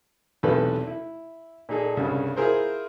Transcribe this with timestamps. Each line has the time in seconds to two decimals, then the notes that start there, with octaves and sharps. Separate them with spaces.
0.43 B1 E2 C3 A3 A4 B4
0.87 E4
1.69 A#2 D#4 G#4 A4
1.97 C2 G2 C#3
2.36 E4 F4 G#4 A#4 C5